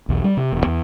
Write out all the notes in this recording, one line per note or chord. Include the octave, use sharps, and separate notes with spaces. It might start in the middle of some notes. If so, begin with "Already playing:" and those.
B1 E2
G3
C3
E1
E2